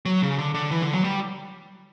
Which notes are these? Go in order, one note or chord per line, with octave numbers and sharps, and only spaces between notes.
F#3
C#3
D3
D3
E3
D3
F#3
G3